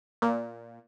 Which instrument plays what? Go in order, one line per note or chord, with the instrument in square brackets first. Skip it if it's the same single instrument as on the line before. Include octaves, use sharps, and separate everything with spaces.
[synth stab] A#2